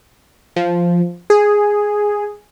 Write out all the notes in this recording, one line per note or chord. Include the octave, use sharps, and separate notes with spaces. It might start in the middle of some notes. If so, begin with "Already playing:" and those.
F3
G#4